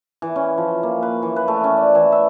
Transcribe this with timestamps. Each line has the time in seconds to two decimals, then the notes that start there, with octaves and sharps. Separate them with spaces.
0.22 E3
0.36 C#4
0.58 F3
0.83 A#3
1.03 B4
1.22 E3
1.36 B4
1.48 A3
1.64 C#4
1.77 D5
1.95 E3
2.12 E5